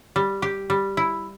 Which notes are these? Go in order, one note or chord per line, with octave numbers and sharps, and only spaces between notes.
G3
G4
G3
E4